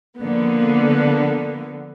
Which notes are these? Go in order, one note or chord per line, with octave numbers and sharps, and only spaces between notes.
D3 F3 A#3 B3